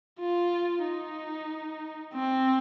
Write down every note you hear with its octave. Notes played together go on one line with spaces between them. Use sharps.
F4
D#4
C4